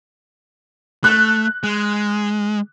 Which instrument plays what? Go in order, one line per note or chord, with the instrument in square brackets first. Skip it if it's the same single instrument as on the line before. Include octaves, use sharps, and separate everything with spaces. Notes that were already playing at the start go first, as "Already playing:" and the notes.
[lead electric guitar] A3 [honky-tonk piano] F#6
[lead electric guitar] G#3